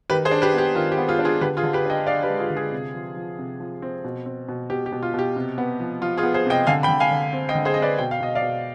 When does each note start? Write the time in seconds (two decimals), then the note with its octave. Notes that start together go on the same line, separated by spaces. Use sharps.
0.10 D#3 G4 B4
0.25 G#4 C5
0.31 D4
0.42 G4 B4
0.54 B3 G4
0.75 D#3 F4
0.92 G4
0.98 B3
1.08 F4 G#4
1.19 D4
1.25 F4 G#4
1.41 D3 G4 B4
1.57 F4 G#4
1.63 D3
1.73 G4 B4
1.85 D4 D#5 G5
2.07 D4 D5 F5
2.23 G4 B4
2.29 G#3
2.39 F4 G#4
2.50 D3
2.56 F4 G#4
2.72 C3
2.94 F3
3.16 F3
3.39 C3
3.60 F3
3.82 C4
4.05 B2
4.26 C4
4.49 B2
4.70 B2 G4
4.86 G4
4.92 B2
5.03 F4
5.14 B2 G4
5.36 C3
5.58 B3
5.80 F3
6.02 F3 F4
6.17 F4 G#4
6.23 B3
6.34 G#4 C5
6.46 C3 D#5 G5
6.67 D3 F5 G#5
6.83 G5 B5
6.89 D3
7.00 F5 G#5
7.11 D3
7.33 C4
7.49 D#5 G5
7.55 D3
7.65 G#4 C5
7.74 C4 D#5
7.82 B4 D5
7.98 B2 G5
8.11 F5
8.20 B2 D#5
8.35 D5 F5
8.42 B2